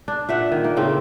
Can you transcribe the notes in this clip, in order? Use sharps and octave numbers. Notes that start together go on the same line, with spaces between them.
D4
A#2 E5 F#5
D#3
A#3
A2 C#3 C4